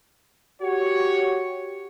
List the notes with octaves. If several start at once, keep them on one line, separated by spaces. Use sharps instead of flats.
F#4 G4 C#5